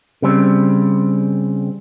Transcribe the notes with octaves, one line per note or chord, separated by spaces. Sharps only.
C#3 G3 C4